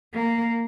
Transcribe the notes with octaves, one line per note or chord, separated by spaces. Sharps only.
A#3